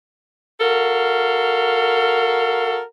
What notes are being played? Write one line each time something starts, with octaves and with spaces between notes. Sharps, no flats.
F#4 A4 A#4 F5